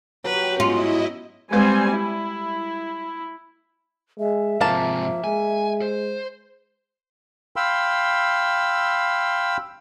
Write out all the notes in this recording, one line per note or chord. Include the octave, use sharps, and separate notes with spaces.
F#3 G4 B4
G#2 B3 C#4 E4 F4 D#5
G3 G#3 C4 B4 G#5
E4
G#3 E5
G#2 C3 F3 A#3 A5
G#3 G#5
C5
F5 G5 B5 C6 E6